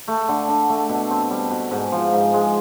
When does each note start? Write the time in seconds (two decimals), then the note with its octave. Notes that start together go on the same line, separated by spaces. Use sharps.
0.08 A3
0.29 D3
0.49 D3
0.69 A3
0.89 B2
1.10 C4
1.31 G3
1.51 B2
1.71 G#2
1.92 F3
2.13 G#2
2.34 G#3